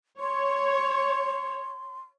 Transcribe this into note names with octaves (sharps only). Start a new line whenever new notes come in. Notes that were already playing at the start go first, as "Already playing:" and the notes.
C#5 C6